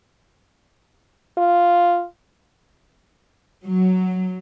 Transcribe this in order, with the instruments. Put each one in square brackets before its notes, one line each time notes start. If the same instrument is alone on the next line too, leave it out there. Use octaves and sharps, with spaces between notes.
[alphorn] F4
[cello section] F#3